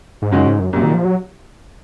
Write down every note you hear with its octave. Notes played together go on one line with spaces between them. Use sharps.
G#2
C#2 F#2 C#3 G#3 D#4 F#4
G#2
F#2
C2 F#2 A#2 F#3
D#3
F3
F#3